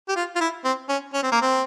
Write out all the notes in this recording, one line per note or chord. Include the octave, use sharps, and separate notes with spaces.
G4
F4
F4
E4
C4
C#4
C#4
C4
A#3
C4